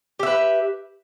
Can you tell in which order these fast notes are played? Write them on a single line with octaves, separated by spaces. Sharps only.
G4 E5 B4